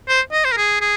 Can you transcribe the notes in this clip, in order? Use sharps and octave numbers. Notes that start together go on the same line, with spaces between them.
C5
D#5
C5
A#4
G#4
G#4